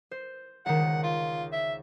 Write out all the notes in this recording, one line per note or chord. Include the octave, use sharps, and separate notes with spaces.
C5
C#2 D#3 F#5
F4
E5